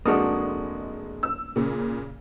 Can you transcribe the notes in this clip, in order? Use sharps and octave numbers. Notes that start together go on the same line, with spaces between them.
F1 G#3 A#3 D4 F#4 D#6
E6
A#2 C#3